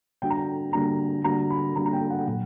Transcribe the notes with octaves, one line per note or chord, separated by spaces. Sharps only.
D3 G3 A#3 D4 F#4 G5
A#5
G5
D3 G3 A#3 D4 F#4 A#5
D3 G3 A#3 D4 F#4 A#5
B5
D3 G3 A#3 D4 F#4 A#5
A#5
G5
F#5
A#2 F#3 A#3 F#5